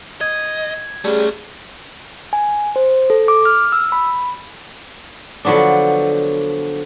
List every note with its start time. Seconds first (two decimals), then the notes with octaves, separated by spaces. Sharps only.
0.21 D#5 G#6
1.05 G3 A3 C#4 G#4
2.33 G#5
2.76 C5
3.10 A4
3.28 D6
3.45 F6
3.72 E6
3.92 B5
5.45 D3 F3 F#3 B3 D4